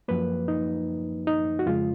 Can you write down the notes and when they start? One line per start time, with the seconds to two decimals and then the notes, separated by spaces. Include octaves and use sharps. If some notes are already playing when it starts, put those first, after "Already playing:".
0.08 F#2 F3 A#3 B4
0.48 D#4
1.27 D#4
1.59 F#4
1.66 F2 C#3 G#3 F4